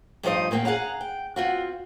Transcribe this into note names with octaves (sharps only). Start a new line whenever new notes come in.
G2 F3 D#4 C5 D#5
E2 A#2 A#3 C4 G5
G#4 F5 F#5 A#5
G5
C4 F4 F#4